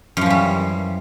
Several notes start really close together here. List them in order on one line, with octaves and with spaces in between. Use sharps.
F#2 F3 E3 G3